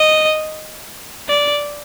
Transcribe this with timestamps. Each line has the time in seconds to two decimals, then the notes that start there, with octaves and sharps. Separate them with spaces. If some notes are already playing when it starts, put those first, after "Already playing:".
Already playing: D#5
1.29 D5